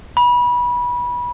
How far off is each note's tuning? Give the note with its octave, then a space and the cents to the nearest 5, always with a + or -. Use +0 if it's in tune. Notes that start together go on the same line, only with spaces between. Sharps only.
B5 -25